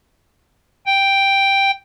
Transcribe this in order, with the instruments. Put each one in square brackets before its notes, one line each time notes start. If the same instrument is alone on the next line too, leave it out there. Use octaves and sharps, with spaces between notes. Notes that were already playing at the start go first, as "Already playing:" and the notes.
[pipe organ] G5